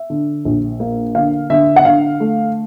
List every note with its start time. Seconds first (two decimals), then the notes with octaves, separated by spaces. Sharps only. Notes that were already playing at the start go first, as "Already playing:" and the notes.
Already playing: E5
0.10 D3
0.45 A#1
0.80 A#3
1.15 D3 F5
1.50 D3 E5
1.76 F#5
1.85 D3 F5
2.20 A3